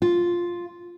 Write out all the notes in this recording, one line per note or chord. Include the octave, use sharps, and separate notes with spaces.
F4